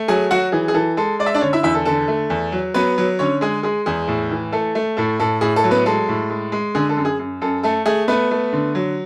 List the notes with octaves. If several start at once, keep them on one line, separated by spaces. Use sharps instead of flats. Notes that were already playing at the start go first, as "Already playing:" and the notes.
Already playing: A3
F#3 G#4 G#5
F#3 F#4 F#5
E3 G#4
G#4
E3 A4
G#3 A4
G#3 D5
E5
D4 D5
D3 C#4 C#5
E4 E5
E2 E4 E5
A4
D3 A4
A3
E2
F#3
F#3 B3 B4
F#3
D3 C#4 C#5
G#3 G#4
G#3 G#4
E2 G#4
A2
E3
A3 A4
A3
A2 A4
A2 A4
A2 G#4
A4
F#3
B3 B4
G#3 A4
A2
G#3
G#3
D3 G#4
A4
F#2
G#4
F#2
F#2 A4
A3 A4
A3 G#4
A3 B3 B4
A3
D3
F#3